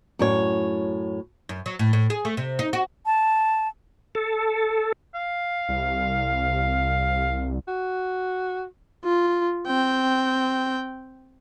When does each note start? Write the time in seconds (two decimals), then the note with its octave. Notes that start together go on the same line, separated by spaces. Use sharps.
0.19 F#2 A2 C#5
1.49 F#2
1.66 F#3
1.79 A2
1.93 A2
2.10 G#4
2.25 A3
2.37 C3
2.59 D#4
2.73 F#4
3.06 A5
4.15 A4
5.14 F5
5.69 C2
7.68 F#4
9.04 F4
9.67 C4 G5